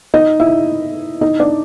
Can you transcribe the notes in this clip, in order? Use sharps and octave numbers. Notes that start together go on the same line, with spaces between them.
D#4 D#5
E4 E5
D#4 D#5
D4 D5